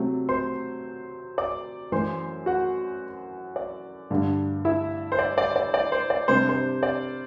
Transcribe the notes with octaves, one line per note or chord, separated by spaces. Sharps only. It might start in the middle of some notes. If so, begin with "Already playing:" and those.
Already playing: C3 F#3 A3 C4
C5 C6
D5 D6
F#2 E3 A3 C5 C6
F#4 F#5
D5
G2 D3 A3 D4
E4 E5
C5
D5
D5
D5
D5
C5
D5
C3 G3 D4 C5
C5
D5